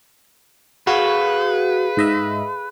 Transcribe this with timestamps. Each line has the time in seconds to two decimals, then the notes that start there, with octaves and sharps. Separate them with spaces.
0.87 F#4 G#4 A4 B4 F5
1.97 G#2 D#5 E5